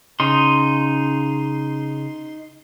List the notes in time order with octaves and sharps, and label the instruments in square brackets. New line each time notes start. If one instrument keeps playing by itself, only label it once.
[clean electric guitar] C#3 [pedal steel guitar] D#4 C6